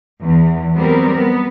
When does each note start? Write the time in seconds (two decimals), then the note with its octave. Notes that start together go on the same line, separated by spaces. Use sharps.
0.21 E2
0.75 F#3 G3 B3 C4 A#4
1.15 B3